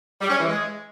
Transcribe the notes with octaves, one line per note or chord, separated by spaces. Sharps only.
G3
C#4
E3
G#3